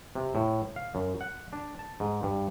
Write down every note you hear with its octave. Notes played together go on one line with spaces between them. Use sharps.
C3
A2
F5
F#2
F#5
D4
A5
G#2
G2